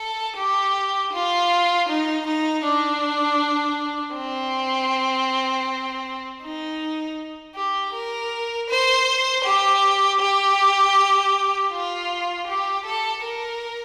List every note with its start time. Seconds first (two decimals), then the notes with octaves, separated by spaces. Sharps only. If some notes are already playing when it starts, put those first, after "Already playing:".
Already playing: A4
0.36 G4
1.13 F4
1.88 D#4
2.26 D#4
2.64 D4
4.15 C4
6.43 D#4
7.55 G4
7.93 A#4
8.70 C5
9.44 G4
10.20 G4
11.72 F4
12.47 G4
12.85 A4
13.23 A#4